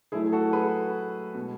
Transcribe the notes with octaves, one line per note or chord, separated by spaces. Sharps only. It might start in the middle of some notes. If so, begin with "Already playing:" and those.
A2 F#3 A3 E4 G#4
F#4 A4
G#4 B4
B2 G#3